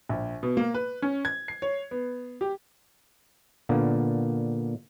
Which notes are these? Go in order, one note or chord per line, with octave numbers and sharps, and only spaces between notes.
A#1
B2
A#3
B4
C#4
G#6
C7
C#5
B3
G4
A#2 D3 A#3 B3